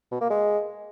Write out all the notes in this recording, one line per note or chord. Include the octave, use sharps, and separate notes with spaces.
B2
A#3
G#3